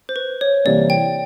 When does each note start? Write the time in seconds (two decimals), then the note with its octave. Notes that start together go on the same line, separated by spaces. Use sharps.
0.09 C5
0.16 B4
0.41 C#5
0.65 C3 E3 G3 A#3 D5
0.90 G5